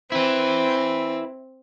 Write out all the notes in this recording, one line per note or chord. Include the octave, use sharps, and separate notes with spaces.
C4 E4 B4